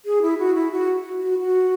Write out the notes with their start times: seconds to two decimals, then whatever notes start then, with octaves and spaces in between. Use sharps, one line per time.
0.06 G#4
0.22 E4
0.38 F#4
0.55 E4
0.72 F#4
1.22 F#4
1.39 F#4